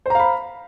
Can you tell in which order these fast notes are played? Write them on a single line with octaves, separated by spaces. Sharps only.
C5 A#5 F5 B5